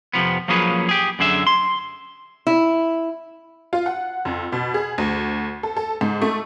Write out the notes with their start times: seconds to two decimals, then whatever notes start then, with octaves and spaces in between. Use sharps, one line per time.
0.14 F2 C3 F3 B3
0.48 F3 F#3 A#3 C#4 G#4 B4
0.89 G4 G#4
1.19 F#2 D3 G#4 E5
1.47 C6
2.47 E4
3.73 F4
3.86 F#5
4.25 F2
4.52 B2
4.74 G#4
4.98 D2
5.63 A4
5.77 A4
6.01 G#2
6.22 A3